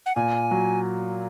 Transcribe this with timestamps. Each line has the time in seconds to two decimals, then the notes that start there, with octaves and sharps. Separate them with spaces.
0.06 F#5
0.16 A#2 G#5
0.51 F#3